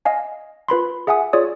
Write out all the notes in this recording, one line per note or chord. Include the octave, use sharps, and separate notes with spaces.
D#5 F5 G#5
F4 B4 B5 C6
G#4 E5 F#5 G#5 D#6
F4 G#4 C#5 D5 D#6